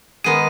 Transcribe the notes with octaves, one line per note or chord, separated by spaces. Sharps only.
D#3 G#3 B3 D#4 G#4 D#7